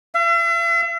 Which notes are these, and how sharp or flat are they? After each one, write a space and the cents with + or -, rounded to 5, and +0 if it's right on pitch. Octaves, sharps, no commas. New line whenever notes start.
E5 +45